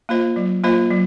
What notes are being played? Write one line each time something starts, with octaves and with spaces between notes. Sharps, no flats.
A#3 F4 C5 D#5
F#3
A#3 F4 C5 D#5
F#3